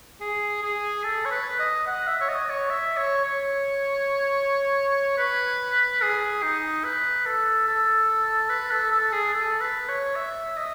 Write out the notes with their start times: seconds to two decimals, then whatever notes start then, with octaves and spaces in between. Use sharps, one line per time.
0.21 G#4
0.63 G#4
1.04 A4
1.25 C#5
1.31 B4
1.59 D#5
1.87 F#5
2.07 E5
2.21 C#5
2.29 D#5
2.49 C#5
2.70 E5
2.97 C#5
3.25 C#5
5.18 B4
6.02 G#4
6.43 D#4
6.84 B4
7.26 A4
7.67 A4
8.50 B4
8.71 A4
8.91 A4
9.12 G#4
9.33 A4
9.61 B4
9.89 C#5
10.16 E5
10.57 D#5